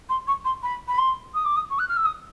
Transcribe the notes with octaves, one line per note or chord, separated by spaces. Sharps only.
C6
C#6
C6
B5
B5
C6
D#6
D6
D#6
C#6
F#6
F6
E6
D#6